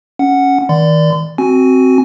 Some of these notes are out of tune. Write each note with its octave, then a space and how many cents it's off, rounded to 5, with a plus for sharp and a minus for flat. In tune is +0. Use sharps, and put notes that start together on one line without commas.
C#4 +0 F#5 +0
D#3 +40 D5 +0 C6 -40
C4 +0 F#4 +10 G#5 +10